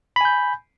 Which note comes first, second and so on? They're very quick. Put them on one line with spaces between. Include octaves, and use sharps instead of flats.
B5 G#5 G6